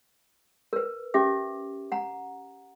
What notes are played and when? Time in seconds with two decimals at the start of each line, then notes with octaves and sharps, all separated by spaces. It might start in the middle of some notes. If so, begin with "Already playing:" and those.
0.73 A#4 B4
1.14 C#4 G4 E5 D6
1.92 F#5 A#5